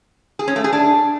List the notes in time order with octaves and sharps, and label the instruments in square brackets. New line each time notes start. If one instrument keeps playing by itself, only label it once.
[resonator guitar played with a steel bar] G#4
C#4
A3
G#4
D4